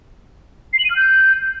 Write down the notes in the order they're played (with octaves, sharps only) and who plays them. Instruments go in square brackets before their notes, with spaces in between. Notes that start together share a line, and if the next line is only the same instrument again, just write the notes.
[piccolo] C7
F#7
D#7
F6
G6